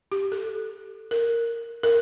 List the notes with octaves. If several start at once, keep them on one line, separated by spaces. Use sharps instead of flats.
G4
A4
A#4
A#4